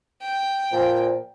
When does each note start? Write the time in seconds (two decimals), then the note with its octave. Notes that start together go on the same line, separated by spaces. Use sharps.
0.22 G5
0.72 A#2 F3